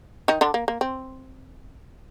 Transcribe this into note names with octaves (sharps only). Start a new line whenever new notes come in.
D#3 D#4
D3 D4
A#3
A#3
C4